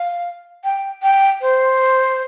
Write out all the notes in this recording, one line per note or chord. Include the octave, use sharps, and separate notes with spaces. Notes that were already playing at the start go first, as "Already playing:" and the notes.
Already playing: F5
G5
G5
C5